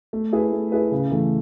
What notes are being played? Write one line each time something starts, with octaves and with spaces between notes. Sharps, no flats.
A3
E4 G#4 B4
A3
E4 G#4 B4
C#3
E3 A3